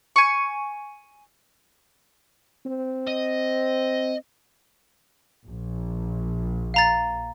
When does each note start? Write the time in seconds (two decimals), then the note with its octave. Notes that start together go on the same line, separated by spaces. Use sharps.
0.16 G#5 C#6
2.66 C4
3.07 D#5
5.48 A#1
6.74 F5 A#5 A6